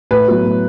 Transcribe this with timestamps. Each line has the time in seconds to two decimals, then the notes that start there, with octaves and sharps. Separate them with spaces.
0.11 A2 B4
0.28 F#3 B3 F#4
0.45 A2